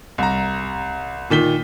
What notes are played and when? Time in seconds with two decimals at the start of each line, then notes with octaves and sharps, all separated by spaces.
0.18 C2 A#5
1.30 A#2 D#3 B6 G7